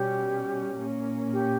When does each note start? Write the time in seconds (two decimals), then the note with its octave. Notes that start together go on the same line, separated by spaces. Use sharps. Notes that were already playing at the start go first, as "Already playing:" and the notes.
Already playing: B2 G3 C#4 G4
0.80 A#2 A#3 C#4
1.33 G4